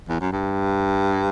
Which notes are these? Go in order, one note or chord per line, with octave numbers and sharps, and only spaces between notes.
E2
F#2
G2